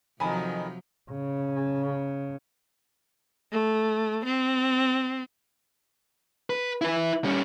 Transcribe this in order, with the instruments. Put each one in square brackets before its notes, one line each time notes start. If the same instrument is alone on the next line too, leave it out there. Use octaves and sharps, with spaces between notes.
[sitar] F2 D#3 [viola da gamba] C3 F3 F#3 [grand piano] G#5 A#5 B5
[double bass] C#3
[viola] A3
C4
[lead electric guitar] B4
E4 B4
G3 C#4